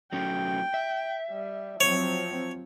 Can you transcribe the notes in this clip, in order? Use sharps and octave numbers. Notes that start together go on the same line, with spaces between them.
F#3 A3 C#4 G5
E5
G3
F3 F#3 C4 C#5